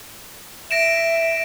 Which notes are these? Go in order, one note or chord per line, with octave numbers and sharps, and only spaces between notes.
E5 A#6 D7 E7